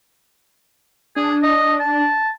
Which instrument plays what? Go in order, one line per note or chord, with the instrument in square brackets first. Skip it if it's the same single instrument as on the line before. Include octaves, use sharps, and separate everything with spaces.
[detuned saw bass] D4 [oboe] G#4
[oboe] D#5
A5